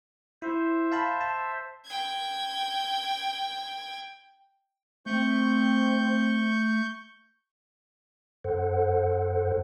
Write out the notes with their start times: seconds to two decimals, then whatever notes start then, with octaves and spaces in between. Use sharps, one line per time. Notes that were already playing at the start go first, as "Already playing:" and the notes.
0.42 E4 C5 E5
0.92 F5 A5 B5
1.21 A5
1.85 G5 G#6
5.06 A3 C4 C#6 G6
8.44 F#2 A4 C5 F#5